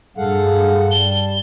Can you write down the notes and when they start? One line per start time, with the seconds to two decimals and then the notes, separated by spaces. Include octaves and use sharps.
0.17 G2 G#4 A4 F5 F#5
0.91 G3 A5 G7